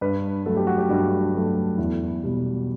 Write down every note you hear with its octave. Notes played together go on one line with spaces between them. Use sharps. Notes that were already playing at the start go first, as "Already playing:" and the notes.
G2 B4
F#3 A3 A4
G4
F#4
G4
G2 F#4
F#3 A3
E2 E4
B2 G3